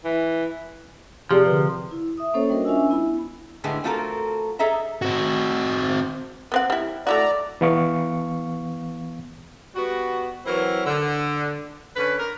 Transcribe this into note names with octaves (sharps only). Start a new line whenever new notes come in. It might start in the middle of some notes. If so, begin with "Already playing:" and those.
E3
C3 F3 G4 G#4 D5
D3 B4
E4
E5 D#6
A#3 C#4 A4 C5 C#5
G3 D4 F#4 A#4 D#5
C#4 D4 F4 E5 G#5 E6
B3 E4 B5
A2 D3 G#3 B3 G#4
A3 C4 F4 F#4 A4 A#4
G#4 A4 D#5 E5 A#5
C4 F#4
B3 C4 F#5
G3 E4
A3 E4 F#4 D5 A#5
E3 B3 F5 C#6
G3 B3 F#4
E3 F#3 C4 E4 A#4
D3
D3 C#4 B4
A#4